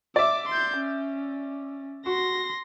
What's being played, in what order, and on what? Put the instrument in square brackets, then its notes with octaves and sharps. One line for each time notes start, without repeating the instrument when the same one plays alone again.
[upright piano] D5 E5 [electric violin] D6
[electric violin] C6 G6
C#4
[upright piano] F#4 [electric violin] C6 A#6